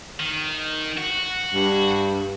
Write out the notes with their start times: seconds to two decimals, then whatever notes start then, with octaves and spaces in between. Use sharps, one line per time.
0.20 D#3
0.98 F#4
1.54 G2